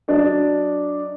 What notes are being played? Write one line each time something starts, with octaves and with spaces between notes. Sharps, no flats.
F#3 D4 D#5